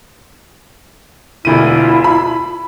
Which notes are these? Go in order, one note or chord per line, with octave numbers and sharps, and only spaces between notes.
E1 D2 E4 F4 D#7
B5